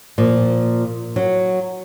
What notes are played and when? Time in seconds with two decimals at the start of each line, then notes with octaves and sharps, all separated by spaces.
0.18 A#2 F3
1.16 F#3